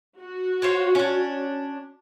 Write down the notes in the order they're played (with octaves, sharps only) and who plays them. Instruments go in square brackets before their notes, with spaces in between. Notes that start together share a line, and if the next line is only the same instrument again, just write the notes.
[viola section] F#4
[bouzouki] F4 C5 C#5
C#4 D4